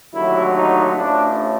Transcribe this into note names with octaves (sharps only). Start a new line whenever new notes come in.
D#2 D3 F#3 A3 E4
D#4
A1 A2 F3 D4